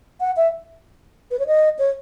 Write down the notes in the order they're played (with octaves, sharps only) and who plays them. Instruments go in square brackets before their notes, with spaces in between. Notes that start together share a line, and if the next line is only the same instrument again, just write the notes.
[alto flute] F#5
E5
B4
C#5
D#5
C#5